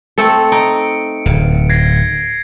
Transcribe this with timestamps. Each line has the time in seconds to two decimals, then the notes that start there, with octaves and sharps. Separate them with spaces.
0.18 A3 C4 A4 C#7
0.52 D#4 D7
1.26 D1
1.69 G#6 A#6 C7